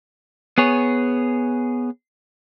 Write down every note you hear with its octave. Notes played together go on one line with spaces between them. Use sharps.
B3 G#4 C#5